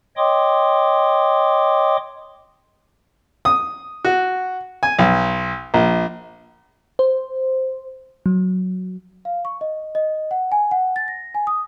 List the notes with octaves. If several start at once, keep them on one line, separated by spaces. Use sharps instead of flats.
C#5 D#5 G5 C6 D6 D#6
D#6
F#4
G#5
B1
A#1
C5
F#3
F5
C#6
D#5
D#5
F#5
G#5
F#5
A6
A#6
G#5
D#6